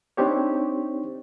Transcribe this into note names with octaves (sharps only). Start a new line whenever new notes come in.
C4 D4 D#4 G4 C5 C#5